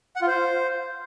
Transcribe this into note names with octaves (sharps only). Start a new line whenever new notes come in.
F#5
F4
C5